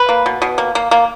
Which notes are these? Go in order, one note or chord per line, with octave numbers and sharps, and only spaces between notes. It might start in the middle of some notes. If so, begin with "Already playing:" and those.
Already playing: B4
A#3
B2
B2
A#3
A#3
A#3